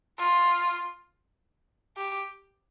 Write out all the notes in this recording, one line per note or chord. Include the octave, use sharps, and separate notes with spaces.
F4
G4